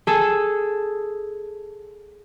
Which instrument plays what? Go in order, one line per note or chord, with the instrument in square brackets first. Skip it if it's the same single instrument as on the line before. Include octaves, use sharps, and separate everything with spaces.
[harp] G#4 A4